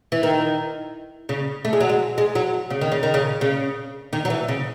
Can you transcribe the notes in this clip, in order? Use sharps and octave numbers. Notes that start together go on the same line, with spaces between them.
E3
D#3
C#3
A3
G#3
F#3
G#3
G#3
F#3
C#3
D#3
C#3
D#3
C#3
C#3
D#3
F#3
E3
C#3